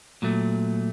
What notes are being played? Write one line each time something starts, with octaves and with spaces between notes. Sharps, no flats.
A#2 F#3 A3